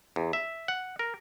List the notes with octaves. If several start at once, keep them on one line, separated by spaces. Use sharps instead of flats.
E2
E5
F#5
A#4